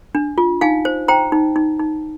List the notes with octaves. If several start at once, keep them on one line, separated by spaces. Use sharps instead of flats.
D4
F4
D#4 F5 G#5
C5
C5 G5 A#5
D#4
D#4
D#4